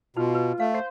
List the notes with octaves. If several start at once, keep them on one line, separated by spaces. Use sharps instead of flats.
B2 D#4 F4
B4
A3 F5
C5